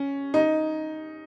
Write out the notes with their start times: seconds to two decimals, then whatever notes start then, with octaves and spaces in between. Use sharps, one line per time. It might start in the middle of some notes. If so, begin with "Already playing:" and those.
Already playing: C#4
0.34 D#4